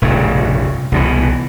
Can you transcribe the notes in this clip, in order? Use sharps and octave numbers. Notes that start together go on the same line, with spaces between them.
F1 A#1 G2 C#3
C2 B2 E3